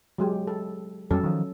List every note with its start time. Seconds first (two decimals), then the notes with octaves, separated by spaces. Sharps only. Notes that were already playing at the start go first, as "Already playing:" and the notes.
0.18 F#3 G#3 G4
0.47 A4
1.11 F2 F#3 G3 C#4 A4
1.23 D#3 F3